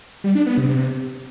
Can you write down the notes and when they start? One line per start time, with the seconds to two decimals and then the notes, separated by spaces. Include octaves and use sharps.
0.24 G3
0.35 D4
0.46 B3
0.58 C3
0.69 C3